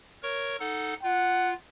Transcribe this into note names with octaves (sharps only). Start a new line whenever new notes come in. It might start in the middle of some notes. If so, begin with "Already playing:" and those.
A#4 C#5 C#6
D#4 A4 F#5
F4 F#5